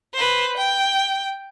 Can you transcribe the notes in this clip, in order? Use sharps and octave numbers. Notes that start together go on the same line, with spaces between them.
B4 C5
G5